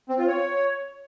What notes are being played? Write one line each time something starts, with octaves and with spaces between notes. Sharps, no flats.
C4
F4
C#5